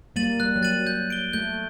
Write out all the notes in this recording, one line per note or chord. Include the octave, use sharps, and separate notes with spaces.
G3 A#3 A6 D#7 F#7
G3 F#6
F#3
A6 D#7 F#7
G6
D7 G7
A3 G6